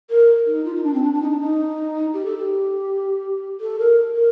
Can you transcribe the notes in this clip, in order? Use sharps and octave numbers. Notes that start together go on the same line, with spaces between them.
A#4
D#4
F4
D#4
D4
C4
D4
D4
D#4
D4
D#4
G4
A4
G4
A4
A#4
A#4